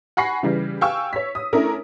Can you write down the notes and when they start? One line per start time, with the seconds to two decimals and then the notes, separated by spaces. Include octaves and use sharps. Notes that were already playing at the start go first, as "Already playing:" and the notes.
0.17 F#5 G#5 B5 C#6 A#6 C7
0.43 C#3 E3 G3
0.81 F5 G5 G#5 C#6 E6
1.13 C#5 B6
1.35 D#6
1.53 A3 C#4 D4 E4 A#4